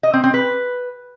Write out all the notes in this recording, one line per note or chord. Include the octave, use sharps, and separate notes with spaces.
D#5
C4
C4
B4